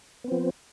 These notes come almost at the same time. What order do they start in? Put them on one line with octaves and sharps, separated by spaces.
B3 C4 F3